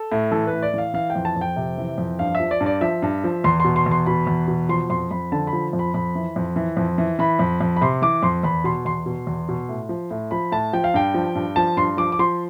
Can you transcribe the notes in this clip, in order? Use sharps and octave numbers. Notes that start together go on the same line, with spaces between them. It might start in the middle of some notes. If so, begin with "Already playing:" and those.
Already playing: A4
A2
E3 A4
B4
A2
D5
E3 F5
E3 F5
G5
F2
A5
F2
G5
C3
E3
F2
G2 F5
E5
F3
D5
G2
D5
F3 E5
G2
F3
E2 C6
B2 C6
C6
E2
C6
B2 B5
E2
B2
F3 C6
F2 C6
F2 B5
D3 A5
B5
F3
F2
B5
F2 B5
E3
F2
E3
F2
E3
E3 B5
F2
F2
B5
C3 C6
E3 D6
F2 C6
E2 B5
B2 C6
E2 C6
B2
E2
B2
A2
F3
A2
F3 B5
A2 A5
F3 G5
F5
G2 G5
F3
G2
F3 A5
G2 C6
F3 D6
D6
F3 C6